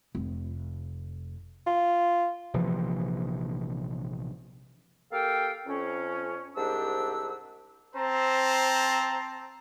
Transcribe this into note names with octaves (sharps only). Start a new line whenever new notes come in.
F1
F4
A#1 C3 E3 F3
A#3 G4 A4 F5 G5
F2 C#4
C2 G#2 D4 G4 E6
C4 C5 A5 A#5